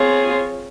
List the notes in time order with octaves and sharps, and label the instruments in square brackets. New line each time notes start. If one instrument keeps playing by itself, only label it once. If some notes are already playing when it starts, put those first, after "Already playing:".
Already playing: [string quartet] C4 F4 G#4 C#5